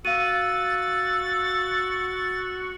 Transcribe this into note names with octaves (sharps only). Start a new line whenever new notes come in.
F#4 F5 E6 A6 D#7